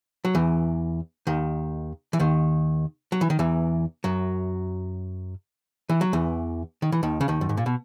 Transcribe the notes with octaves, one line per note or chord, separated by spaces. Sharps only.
F#3
E2 E3
D#2 D#3
E3
D#2 D#3
F#3
E3
D#3
E2 E3
F#2 F#3
E3
F#3
E2 E3
D#3
E3
D#2 D#3
C#3
D#2 D#3
F#2
G#2
A#2
B2